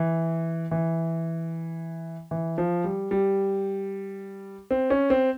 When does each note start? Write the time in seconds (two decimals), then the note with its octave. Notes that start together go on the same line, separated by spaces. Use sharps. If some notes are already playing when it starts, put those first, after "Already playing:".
Already playing: E3
0.71 E3
2.31 E3
2.58 F3
2.84 G3
3.11 G3
4.71 C4
4.90 C#4
5.10 C4